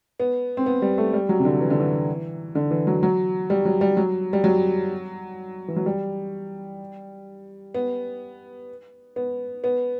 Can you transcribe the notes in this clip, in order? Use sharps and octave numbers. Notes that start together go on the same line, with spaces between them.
B3
C4
B3
G3
A3
G3
F#3
C3
D3
E3
D3
E3
D3
E3
F#3
F#3
G3
F#3
G3
F#3
G3
F#3
E3
F#3
G3
B3
B3
B3